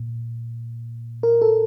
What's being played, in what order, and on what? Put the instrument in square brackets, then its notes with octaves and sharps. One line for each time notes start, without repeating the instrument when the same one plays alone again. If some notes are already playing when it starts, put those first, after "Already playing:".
Already playing: [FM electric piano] A#2
A#4
A4